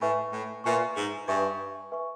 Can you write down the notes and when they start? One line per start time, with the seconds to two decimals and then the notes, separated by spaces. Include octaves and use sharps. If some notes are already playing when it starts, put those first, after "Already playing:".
0.01 A2 B4 E5 G#5 C#6
0.33 A2
0.64 A#2 B4 E5 G#5 C#6
0.96 G#2
1.28 G2 B4 E5 G#5 C#6
1.92 B4 E5 G#5 C#6